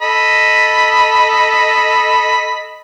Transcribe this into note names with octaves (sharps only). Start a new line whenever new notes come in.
A4 D#5 B5